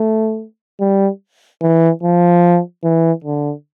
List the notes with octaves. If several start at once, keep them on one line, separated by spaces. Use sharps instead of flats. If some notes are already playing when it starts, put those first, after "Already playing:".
Already playing: A3
G3
E3
F3
E3
D3